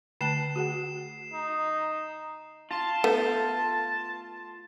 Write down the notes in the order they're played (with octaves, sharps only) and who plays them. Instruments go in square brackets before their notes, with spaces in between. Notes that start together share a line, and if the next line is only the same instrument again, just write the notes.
[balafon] D3 A3 A5 [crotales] C7 E7
[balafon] F#4 G#4 F#5
[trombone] D#4
[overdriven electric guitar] F4 [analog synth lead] A5
[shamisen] A3 B3